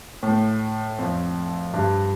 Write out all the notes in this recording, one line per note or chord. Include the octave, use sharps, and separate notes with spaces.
A2
F2
G2